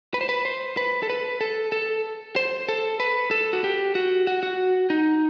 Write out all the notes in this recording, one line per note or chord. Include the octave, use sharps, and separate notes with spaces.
B4
C5
B4
C5
B4
A4
B4
A4
A4
C5
A4
B4
A4
F#4
G4
F#4
F#4
F#4
D#4